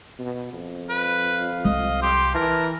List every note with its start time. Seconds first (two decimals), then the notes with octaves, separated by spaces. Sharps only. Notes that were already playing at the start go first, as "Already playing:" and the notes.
0.19 B2
0.53 F2
0.89 B4 F5
1.65 C2 D#5
2.02 G4 C6
2.35 E3 A#4 A5